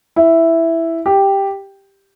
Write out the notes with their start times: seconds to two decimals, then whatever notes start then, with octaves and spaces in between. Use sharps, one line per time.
0.16 E4
1.06 G4